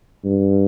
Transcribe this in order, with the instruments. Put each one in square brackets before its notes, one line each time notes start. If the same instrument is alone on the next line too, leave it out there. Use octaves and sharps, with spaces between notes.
[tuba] G2